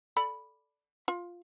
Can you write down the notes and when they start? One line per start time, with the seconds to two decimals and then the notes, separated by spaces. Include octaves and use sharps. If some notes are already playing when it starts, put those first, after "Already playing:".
0.17 A4 D5 B5
1.08 F4